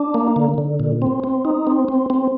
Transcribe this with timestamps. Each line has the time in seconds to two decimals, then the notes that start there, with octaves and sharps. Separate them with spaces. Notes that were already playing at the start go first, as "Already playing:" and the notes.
Already playing: D4
0.14 A#3
0.36 D3
0.58 D3
0.80 A#2
1.02 C4
1.24 C4
1.45 D#4
1.67 C4
1.88 C4
2.10 C4